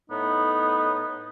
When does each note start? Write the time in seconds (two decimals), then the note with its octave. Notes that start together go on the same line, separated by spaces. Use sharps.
0.10 A2 B3 D#4